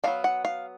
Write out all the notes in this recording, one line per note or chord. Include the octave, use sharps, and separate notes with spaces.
F#3 B3 D4 F5
F#5
F5